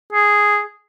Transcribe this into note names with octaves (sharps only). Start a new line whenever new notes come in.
G#4